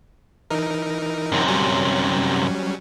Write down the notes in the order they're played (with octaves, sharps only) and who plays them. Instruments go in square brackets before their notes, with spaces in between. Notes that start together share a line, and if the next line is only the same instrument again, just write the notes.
[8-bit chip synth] E3 D#4 A#4
[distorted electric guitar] F#2 C3
[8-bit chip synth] F#3 G3 C#4